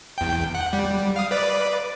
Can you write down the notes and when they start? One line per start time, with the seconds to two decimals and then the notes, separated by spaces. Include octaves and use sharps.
0.18 E2 G5
0.55 F#5
0.73 G3
1.16 F5 D#6
1.31 B4 D5